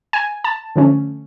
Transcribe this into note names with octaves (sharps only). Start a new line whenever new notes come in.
G#5
A5
D3 F3 A3 C#4